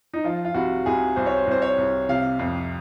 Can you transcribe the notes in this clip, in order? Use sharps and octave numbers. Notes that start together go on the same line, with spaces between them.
D#4
F3 F4
F4
C2 F#4
C2 G#4
C2 C5
C#5
C5
C2 C5
C#5
C2
C3 F5
F2